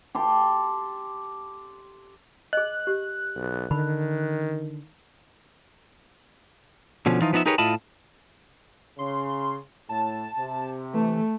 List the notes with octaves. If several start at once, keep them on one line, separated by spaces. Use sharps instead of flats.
G4 A4 C6
G#4 D#5 F#6
G4
B1
D3 D#3 B5
B2 D3 F3 C#4
E3 F3 D#4 F4
F3 B3 D#4 D5 E5
D#4 G4 G#4 A#4 B4 C#5
A2 E4 F4 D#5 A5 B5
C#3 C6
A2 A5
C3
E3 A3